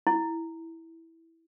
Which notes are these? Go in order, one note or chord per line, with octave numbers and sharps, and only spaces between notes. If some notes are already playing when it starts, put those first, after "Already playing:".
E4